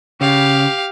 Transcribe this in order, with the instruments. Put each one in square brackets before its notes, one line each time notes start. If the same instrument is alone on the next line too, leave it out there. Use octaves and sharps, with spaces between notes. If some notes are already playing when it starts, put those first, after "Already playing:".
[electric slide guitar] C#3 [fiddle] G4 F5